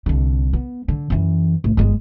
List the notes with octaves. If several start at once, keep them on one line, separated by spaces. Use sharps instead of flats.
C2 D3
B3
D3
F#2 E3
A1
G1 G#3